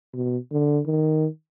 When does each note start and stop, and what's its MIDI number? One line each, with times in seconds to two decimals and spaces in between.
0.13 0.37 47
0.52 0.79 50
0.86 1.26 51